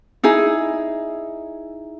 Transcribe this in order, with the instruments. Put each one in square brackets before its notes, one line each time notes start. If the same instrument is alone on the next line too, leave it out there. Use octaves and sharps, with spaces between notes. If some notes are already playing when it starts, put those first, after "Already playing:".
[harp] D#4 E4 G#4